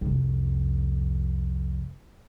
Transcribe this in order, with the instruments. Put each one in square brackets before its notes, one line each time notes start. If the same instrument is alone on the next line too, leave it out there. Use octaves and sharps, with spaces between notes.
[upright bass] C2 F2